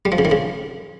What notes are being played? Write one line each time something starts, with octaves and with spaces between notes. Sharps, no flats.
G3
F3
C#3
D#3
C#3